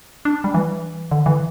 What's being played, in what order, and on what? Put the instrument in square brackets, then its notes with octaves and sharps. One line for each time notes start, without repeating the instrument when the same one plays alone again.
[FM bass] D4
G3
E3
D3
E3